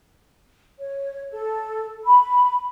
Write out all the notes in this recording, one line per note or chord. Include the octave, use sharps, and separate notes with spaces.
C#5
A4
B5